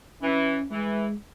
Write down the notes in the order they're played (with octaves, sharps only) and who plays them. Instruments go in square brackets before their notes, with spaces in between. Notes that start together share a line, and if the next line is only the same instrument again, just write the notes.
[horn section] E3 [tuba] C#4
[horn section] E3 [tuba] G#3